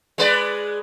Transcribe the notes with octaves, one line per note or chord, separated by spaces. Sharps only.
G#3 B4 D5